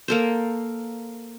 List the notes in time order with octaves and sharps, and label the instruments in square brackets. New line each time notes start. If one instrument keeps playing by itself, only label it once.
[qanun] A#3 A4 C5